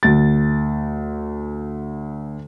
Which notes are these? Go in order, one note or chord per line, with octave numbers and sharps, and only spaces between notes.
D2 A6